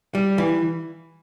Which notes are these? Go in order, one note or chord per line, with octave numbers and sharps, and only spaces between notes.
G3
E3